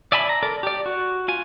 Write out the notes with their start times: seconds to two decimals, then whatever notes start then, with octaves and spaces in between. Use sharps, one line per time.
0.12 D5 E5 G#5 A5 B5
0.29 A#5
0.43 A4 A#4 D5
0.63 G4 D5
0.86 F#4
1.28 F4 G#5